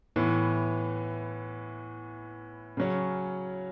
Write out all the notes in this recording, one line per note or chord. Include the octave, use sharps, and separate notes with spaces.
A2 E3 B3
C#3 F#3 C#4